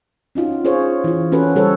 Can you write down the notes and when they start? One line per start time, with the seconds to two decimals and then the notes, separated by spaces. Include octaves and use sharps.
0.35 C#4 D#4 F4 F#4
0.64 C#4 F4 G#4 C5 C#5
1.04 E3 F4
1.32 C#4 F#4 A4 B4
1.55 C#3 G3 A4 C5 C#5